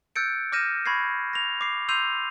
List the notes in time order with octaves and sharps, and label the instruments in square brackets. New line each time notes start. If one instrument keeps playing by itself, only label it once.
[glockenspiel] E6 F#6 G6 A6 C#7 D7
D6 F6 G6 A#6 D#7 E7
B5 C#6 G#6 A#6 C7
A#6 F7
D6 C7
C6 E6 G6 C7 D#7 F7